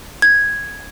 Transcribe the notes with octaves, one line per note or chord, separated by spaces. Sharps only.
G#6